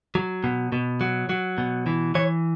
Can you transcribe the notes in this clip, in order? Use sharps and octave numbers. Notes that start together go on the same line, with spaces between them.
F#3
B2
B2
F#3
F#3
B2
E3
E3 C#5